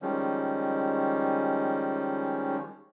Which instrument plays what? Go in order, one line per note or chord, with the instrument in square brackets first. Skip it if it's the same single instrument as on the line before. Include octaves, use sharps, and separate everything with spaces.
[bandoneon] D#3 F3 G3 G#3 C#4